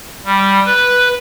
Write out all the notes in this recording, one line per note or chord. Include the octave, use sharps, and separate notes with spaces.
G3
B4